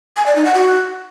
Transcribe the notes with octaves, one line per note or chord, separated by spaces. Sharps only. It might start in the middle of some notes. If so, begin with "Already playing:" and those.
G#5
D5
D#4
F#5
F#4